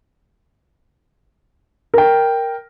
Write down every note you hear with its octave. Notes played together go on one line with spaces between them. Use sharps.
A#4 G5